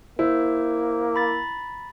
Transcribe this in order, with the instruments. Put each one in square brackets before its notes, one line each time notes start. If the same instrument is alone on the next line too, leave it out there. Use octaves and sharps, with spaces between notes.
[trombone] A#3 [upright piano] E4 [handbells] C5
[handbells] A#5 B5 A6